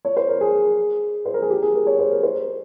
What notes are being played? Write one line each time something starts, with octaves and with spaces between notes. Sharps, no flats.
C#5
C5
A#4
G#4
C5
A#4
G#4
G4
G#4
A#4
C#5
C5
A#4
C5